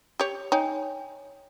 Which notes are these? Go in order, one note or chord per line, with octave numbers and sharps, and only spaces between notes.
G4 C#5
D#4 C#5 G5 G#5